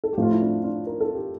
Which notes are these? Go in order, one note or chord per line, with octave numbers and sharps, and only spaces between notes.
A4
G4
A2 F3 A3 F4
E4
D4
D4 F4
A#4
A4
G4